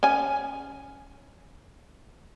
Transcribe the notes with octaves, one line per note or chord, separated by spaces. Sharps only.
C#4 G#5